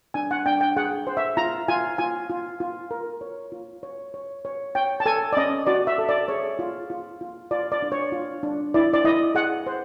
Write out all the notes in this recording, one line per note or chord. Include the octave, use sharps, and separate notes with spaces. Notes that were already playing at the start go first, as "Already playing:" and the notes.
D4 G#5
F#5
D4 G5
G5
G#4 F#5
C5
E5
F4 A#5
F4 G#5
F4 G#5
F4
F4
A#4
C#5
F4
C#5
C#5
C#5
C#5 G5
A5
A4 G#5
D5
C#4 D#5
F#4 D5
E5
A4
D5
G#4 C#5
F4
F4
F4
F4 D5
D5
D4
C#5
F4
D4
E4 D5
D5
E4 D#5
G#4 F#5
C5